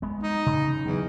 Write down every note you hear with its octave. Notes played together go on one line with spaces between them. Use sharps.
G#3 B3
D#4
C#3
E2 F#3